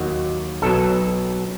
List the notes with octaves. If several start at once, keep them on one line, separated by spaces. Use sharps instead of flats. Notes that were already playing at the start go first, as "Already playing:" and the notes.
Already playing: D#2 D#3 F#3 F#4
B1 B2 F#3 A4